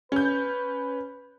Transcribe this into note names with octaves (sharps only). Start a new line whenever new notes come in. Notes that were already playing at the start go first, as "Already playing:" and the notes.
C#4 B4 G6